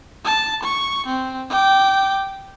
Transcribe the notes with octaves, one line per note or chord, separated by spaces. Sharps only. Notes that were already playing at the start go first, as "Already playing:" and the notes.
A5
C#6
C4
G5 D6